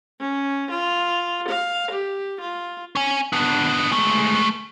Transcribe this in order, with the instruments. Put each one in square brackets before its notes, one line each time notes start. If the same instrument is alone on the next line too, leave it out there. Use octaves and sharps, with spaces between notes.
[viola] C#4
F4
F5
G4
F4
[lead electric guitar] C#4 G#5
B3 D4
G#3 A3